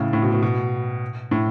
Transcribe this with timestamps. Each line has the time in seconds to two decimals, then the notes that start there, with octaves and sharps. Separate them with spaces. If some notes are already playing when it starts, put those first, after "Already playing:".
Already playing: A2 C#3
0.13 A2
0.22 B2
0.32 B2
0.43 B2
1.31 A2